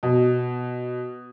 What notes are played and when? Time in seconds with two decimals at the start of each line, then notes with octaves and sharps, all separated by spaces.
0.03 B2